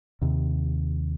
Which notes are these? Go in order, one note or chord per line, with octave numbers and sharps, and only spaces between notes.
D#2 C3